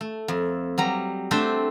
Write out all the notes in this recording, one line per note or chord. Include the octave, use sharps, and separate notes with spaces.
A3
F2
F#3 G3 A#5
A3 C4 D4 C5 E5 G5